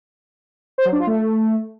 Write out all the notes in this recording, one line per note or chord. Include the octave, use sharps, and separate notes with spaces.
C5
F#3
D4
F4
A3